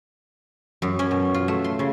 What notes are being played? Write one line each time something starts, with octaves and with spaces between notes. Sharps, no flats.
F#2
C#4
B2
F4
A3
C6
C#3